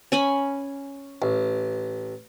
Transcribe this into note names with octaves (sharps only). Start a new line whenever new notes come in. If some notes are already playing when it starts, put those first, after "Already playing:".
C#4 G#5 B5
A1